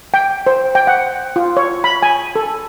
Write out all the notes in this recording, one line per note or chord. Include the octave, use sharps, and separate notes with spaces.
G5
C5
G5
F#5
F4
C#5
B5
G#5
A4